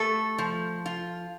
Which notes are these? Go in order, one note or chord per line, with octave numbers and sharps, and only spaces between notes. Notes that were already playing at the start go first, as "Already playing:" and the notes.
Already playing: A3 A4
F3
F4